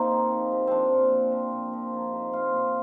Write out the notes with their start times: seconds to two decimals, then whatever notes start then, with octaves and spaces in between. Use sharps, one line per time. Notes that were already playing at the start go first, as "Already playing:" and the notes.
Already playing: C3 A#3 C4 D#4
0.11 D#3
0.31 F3
0.52 C3
0.67 F3 C4 D4
0.93 A#2
1.12 A#2
1.32 F3
1.52 A#2
1.73 F3
1.93 D#3
2.12 C3
2.33 A#2 F4
2.53 A#2